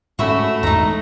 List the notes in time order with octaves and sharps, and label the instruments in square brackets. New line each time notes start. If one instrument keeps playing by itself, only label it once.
[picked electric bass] G#2 C#4 [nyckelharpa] A3 [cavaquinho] F#4 E5 B5
[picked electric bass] A#1 G#2 [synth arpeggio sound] E2 [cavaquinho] D#4 A#5